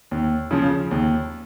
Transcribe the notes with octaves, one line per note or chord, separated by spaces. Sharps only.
D#2
C#3 F3
D#2